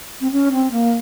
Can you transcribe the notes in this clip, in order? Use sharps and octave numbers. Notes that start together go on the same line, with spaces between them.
C4
C#4
C4
A#3